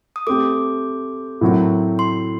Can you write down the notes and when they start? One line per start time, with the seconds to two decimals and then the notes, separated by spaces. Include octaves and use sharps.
0.16 D#6
0.27 A3 C4 G4 D6
1.41 A2 F#3 C4 F#4 A#4
1.99 C6